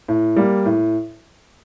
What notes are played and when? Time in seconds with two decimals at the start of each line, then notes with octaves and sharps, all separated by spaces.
0.08 A2
0.37 G3 A#3
0.66 A2